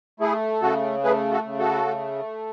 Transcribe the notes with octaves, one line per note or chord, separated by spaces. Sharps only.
A3 E4 G#4
C#3 F#4 A4
A3 G#4 B4
F#4 A4
C#3
F#4 A4
A3